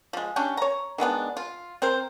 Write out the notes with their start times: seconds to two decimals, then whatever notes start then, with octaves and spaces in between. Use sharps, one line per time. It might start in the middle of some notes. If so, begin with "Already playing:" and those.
0.13 F3 G#3
0.36 C#4 D4 G4
0.57 C#5 A#5
0.98 D#3 G#3 B3 D4
1.37 F4
1.82 C4 A#4 C5